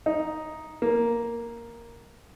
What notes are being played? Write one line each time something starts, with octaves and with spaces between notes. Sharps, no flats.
D#4
A#3